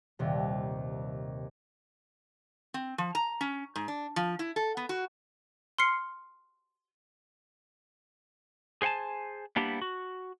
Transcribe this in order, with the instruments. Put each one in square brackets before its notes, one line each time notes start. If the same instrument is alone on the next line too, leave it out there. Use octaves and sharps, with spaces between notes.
[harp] D#1 D#2 C3
[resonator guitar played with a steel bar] C4
F3
A#5
C#4
G#2
D4
F3
E4
A4
B3
F#4
[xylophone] C6 F6 C7 C#7
[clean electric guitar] G#4 C5 F#5 G#5 A5
G3 A#3 B3 D4 E4 G4
F#4